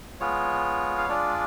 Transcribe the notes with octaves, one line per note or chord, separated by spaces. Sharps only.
G#3 B3 F4 C#5
F5
G#3 D4 F4 D5